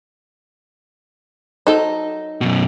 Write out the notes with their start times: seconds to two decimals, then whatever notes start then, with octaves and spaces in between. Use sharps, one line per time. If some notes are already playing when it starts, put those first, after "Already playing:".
1.67 F#3 D#4 A4 C5
2.41 F#2 B2